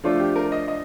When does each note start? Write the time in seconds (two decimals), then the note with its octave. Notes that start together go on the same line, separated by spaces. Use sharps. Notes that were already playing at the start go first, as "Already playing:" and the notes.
0.04 F3 A3 D4 F4 A4
0.20 G4
0.36 A#4
0.52 D#5
0.68 D#5